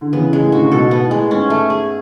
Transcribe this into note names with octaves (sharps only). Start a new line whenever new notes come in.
D3
C#3 E3 B3
G#3
A2 C#3
D3 F#4
C#3
G#2 B2 A4
B3
A2
G#3
G#2 C#4
A3
G#4